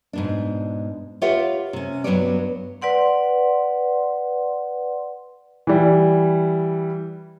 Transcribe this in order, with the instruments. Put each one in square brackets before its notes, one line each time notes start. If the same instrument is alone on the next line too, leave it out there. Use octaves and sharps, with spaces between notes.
[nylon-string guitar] G#2 B2 D4
F4 G4 B4 C#5 E5 F#5
C3 C#4
G2 F#3 B3 B4 C#5 D5
[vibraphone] B4 D5 F#5 C6
[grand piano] E3 G3